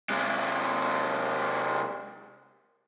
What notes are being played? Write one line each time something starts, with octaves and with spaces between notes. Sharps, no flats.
C3 G#3